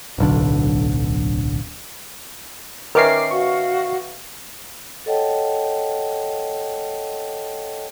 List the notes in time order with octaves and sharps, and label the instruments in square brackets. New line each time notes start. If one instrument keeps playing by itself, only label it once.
[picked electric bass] D1 B1 D3
[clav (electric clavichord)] D#3 C#4 [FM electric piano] A#4 D6 C7 [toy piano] B4 E5
[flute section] F#4 F5 [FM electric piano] C#6
[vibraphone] A4 C#5 D#5 F#5 G5 A5